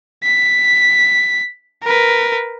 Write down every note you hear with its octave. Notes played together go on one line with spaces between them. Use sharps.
B6
A#4 B4